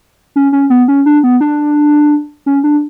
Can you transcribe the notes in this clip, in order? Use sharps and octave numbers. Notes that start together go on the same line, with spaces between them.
C#4
C#4
B3
C#4
D4
B3
D4
C#4
D4